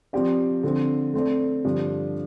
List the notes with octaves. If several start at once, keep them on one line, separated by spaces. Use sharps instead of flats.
F3 C4 G4 D5
D3 F3 C4
A3 C4 A4 D5
G2 D3 F3 D4 G4